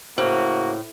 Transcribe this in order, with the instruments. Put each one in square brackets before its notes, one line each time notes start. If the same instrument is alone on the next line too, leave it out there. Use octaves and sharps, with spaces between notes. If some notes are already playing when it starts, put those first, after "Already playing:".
[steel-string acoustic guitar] A2 [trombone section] C#3 A#3 F#4 [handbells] C5